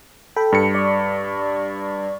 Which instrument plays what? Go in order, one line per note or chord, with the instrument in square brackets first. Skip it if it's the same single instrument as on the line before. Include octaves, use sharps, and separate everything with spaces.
[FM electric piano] A4 G5 B5
[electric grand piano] G2 C#7
[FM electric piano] D5 C#6